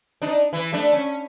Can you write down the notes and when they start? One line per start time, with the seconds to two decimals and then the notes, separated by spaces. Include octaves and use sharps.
0.22 D4 D#4
0.53 E3
0.73 A3 D4
0.93 C#4